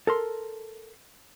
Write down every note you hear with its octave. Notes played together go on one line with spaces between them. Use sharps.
A4 A#4 C6